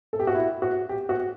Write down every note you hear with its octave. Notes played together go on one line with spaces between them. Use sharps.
A4
G4
F#4
E4
F#4
G4
F#4